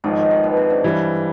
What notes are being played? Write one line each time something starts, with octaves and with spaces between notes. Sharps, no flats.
G#1 G#2 D#3 F3
D#3
D#3
B2
C3
D3
G2 E3 G3